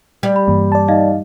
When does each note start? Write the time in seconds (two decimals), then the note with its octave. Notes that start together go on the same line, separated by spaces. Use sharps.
0.23 G3
0.36 B5
0.48 G2 E3 A#3
0.72 D5 A5
0.88 D#4 D#5 F5